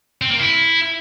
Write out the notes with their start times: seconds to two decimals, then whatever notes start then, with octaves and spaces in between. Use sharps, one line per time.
0.22 C4
0.30 A#3
0.39 E4